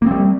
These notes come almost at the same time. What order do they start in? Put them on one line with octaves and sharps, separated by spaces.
A#3 C4 G3